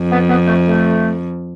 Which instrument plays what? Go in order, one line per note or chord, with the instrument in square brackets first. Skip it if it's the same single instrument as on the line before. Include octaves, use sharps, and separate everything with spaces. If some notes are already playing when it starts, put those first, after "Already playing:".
Already playing: [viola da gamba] F2
[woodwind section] B3
B3
A3
A3